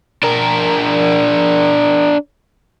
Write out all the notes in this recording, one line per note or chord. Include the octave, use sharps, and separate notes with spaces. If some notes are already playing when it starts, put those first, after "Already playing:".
D4 A#4